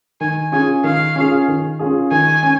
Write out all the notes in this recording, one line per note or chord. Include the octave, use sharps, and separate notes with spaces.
D#3 G#5
C#4 F4 G#4 G#5
D#3 F5
C#4 F4 G#4
D#3
C#4 F4 G#4
D#3 G#5
C#4